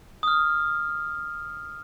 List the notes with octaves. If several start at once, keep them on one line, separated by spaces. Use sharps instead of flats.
D#6 F6